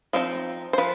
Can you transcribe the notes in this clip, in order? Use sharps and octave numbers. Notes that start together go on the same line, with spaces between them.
F3 C4 D#4
C5
F3 B4